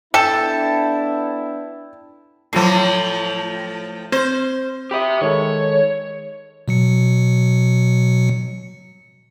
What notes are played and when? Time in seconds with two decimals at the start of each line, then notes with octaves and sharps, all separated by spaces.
0.14 B3 D4 E4 A4 G5 A5
2.53 A2 F3 F#3 F4 C7
4.12 C4 C5
4.91 G4 E5 G5 B5 D#6
5.22 D#3 G#3 A4 C#5
6.68 B2 F#3 C#7